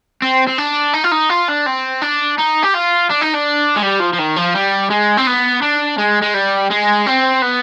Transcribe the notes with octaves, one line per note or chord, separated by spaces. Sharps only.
C4
C4
D4
D#4
F4
D#4
F4
D4
C4
D4
D#4
G4
F4
D4
D#4
D4
G#3
G3
F3
F3
D#3
F3
G3
G#3
C4
B3
D4
G#3
G#3
G3
G#3
C4
B3